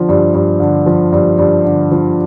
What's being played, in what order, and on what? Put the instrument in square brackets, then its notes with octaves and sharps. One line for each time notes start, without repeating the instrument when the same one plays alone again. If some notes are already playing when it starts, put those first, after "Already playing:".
Already playing: [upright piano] D3 F3
G2
G2
D3
F3
G2
G2
D3
F3